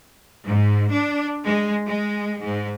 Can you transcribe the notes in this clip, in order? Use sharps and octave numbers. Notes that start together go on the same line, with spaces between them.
G#2
D4
G#3
G#3
G#2